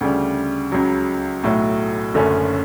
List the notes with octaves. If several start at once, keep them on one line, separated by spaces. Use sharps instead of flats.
D2 C#3 G3
C#2 C#3 F#3
B1 A2 F#3 A3
F#1 F#2 D3 A3 C#4